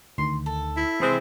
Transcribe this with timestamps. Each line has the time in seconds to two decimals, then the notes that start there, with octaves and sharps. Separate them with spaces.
0.18 D2 D#3 C6
0.46 A4
0.77 E4
1.00 C3 E3 G#3 C4